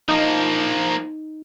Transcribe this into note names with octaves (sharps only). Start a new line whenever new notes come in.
F3 A#3 D#4